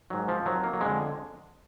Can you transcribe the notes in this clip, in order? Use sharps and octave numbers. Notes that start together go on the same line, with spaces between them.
G#2 D#3 F#3
F3
F2 D#3 F#3
A#3
F#3
F2 D3 G#3